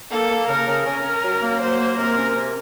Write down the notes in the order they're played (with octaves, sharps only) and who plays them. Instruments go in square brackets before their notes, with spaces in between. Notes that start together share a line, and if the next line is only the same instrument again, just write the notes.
[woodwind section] A#3 [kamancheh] A4
[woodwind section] A#3
[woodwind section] C#3 [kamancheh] A#4
[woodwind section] C#3
[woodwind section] C#4 [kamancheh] A#4
[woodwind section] C#4
F#3
A#3
[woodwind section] F#3 [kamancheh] C5
[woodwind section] A#3
[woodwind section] C3 [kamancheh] A#4
[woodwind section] C#4
C3